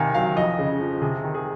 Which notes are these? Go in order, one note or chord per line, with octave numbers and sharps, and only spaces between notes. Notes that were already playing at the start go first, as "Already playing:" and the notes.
Already playing: C3 D#3 F5 G#5
F#3 F5
F2 D#5
C#3
F3
C3 G#4
D#3
G#4